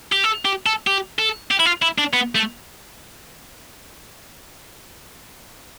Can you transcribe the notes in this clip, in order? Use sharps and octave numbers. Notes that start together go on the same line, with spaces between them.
G4
A4
G4
A4
G4
A4
G4
E4
F4
E4
D4
B3
A3